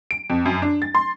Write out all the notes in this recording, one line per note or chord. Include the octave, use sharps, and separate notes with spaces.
D7
F2
F#2
D4
A6
C6